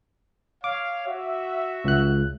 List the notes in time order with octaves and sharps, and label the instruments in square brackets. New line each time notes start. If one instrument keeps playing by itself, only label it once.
[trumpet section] C#5 F5 [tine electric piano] D6
[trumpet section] F#4 E5
[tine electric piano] C#2 F#6